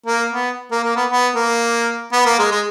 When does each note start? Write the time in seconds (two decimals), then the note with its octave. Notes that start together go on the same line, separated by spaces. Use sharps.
0.07 A#3
0.33 B3
0.72 A#3
0.84 A#3
0.96 B3
1.10 B3
1.35 A#3
2.13 B3
2.26 A#3
2.39 G#3
2.51 G#3